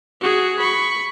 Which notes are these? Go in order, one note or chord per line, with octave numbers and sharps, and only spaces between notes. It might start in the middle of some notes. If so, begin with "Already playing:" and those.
F#4 G#4
B5 C#6